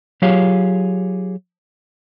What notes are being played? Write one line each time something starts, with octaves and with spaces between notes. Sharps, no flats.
F#3 F4 G4 G#4 C#5 F5